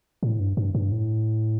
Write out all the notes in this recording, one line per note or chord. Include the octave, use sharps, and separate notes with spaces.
A2
G2
G2
G2
A2